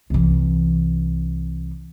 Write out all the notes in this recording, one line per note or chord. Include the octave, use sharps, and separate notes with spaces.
C2 E3